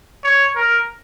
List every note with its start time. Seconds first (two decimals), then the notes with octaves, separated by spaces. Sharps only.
0.24 C#5
0.56 A#4